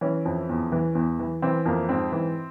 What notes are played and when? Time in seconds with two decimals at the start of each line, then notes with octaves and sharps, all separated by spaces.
0.01 E3 C#4
0.25 F2
0.49 E2
0.72 E3
0.95 E2
1.19 E3
1.42 E3 C4
1.66 F2 A#3
1.89 G#2 C4
2.12 E3